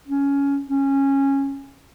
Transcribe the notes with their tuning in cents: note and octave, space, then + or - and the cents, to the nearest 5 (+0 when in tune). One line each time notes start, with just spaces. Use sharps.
C#4 +15
C#4 -15